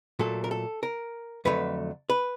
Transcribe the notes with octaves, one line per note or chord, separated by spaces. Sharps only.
A#2 F#3 A3 A4
A#4
A4
A#4
F2 D3 F#3 A3 B4
B4